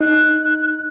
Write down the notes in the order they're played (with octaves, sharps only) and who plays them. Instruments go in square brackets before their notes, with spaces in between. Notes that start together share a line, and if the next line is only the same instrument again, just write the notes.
[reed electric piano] D#4 [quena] F#6